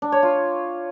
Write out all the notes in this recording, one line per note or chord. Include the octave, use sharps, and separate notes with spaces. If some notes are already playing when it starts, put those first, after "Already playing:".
D4
C#5
F4